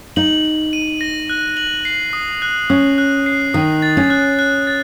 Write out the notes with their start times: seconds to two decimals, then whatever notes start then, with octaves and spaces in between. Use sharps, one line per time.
0.16 D#4 F#7
0.45 F#7
0.73 D#7
1.01 A#6
1.29 F#6
1.57 F#7
1.85 C7
2.13 D#6
2.42 F#6
2.70 C#4 D#6
2.98 F#6
3.26 C7
3.54 D#3 D#6
3.82 A6
3.97 C#4
4.10 F#6
4.39 F#6
4.67 A6